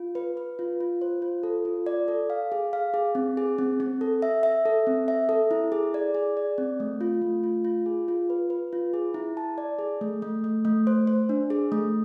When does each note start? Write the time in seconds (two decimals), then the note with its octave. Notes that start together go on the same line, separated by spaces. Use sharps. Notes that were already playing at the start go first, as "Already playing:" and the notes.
Already playing: F4
0.15 B4
0.37 B4
0.59 F4
0.80 F4
1.01 C5
1.22 F4
1.43 A4
1.65 F4
1.86 D5
2.08 A4
2.30 F5
2.52 G#4
2.73 F5
2.94 G#4
3.15 C4
3.37 G#4
3.58 C4
3.80 C4
4.01 A4
4.22 E5
4.43 E5
4.66 A4
4.87 C4
5.08 E5
5.29 A4
5.51 E4
5.72 G#4
5.94 D5
6.15 G#4
6.37 D5
6.58 C4
6.80 A3
7.01 F4
7.22 A3
7.44 F4
7.64 F4
7.86 G#4
8.08 F4
8.30 B4
8.50 B4
8.73 F4
8.94 G#4
9.14 E4
9.37 A5
9.58 D5
9.79 G#4
10.01 A3
10.22 A3
10.44 A3
10.65 A3
10.87 C5
11.07 C5
11.29 D4
11.50 G#4
11.72 A3